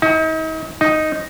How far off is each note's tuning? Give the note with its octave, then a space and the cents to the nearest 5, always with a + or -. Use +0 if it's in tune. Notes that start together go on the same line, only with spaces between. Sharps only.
D#4 +40
D#4 +0